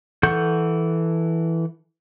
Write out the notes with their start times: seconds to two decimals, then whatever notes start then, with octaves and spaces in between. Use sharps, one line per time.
0.23 E3 A4 F#5 C#6 G6